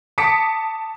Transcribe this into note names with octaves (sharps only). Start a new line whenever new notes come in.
A5 D6 D#6 B6 C#7 D7